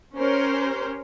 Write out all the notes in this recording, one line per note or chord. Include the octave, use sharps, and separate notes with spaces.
C#4 G4 A#4 C5 C#5